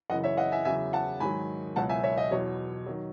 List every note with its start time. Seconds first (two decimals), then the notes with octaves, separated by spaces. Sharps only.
0.10 F#2 C#3 E3 D#5 F#5
0.24 C#5 E5
0.37 D#5 F#5
0.52 E5 G#5
0.65 E2 C#3 F#3 E5 G#5
0.93 F#5 A5
1.20 G#2 D#3 F#3 G#5 B5
1.76 C#2 B2 F#3 F#5 A5
1.89 E5 G#5
2.03 C#5 E5
2.17 D#5
2.31 E2 B2 F#3 C#5
2.86 D#3 F#3